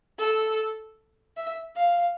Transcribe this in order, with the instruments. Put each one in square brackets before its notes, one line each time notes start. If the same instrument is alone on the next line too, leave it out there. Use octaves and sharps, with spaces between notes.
[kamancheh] A4
E5
F5